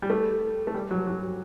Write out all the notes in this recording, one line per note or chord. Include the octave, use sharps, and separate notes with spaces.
G3
A3
A3
G3
F#3
F#3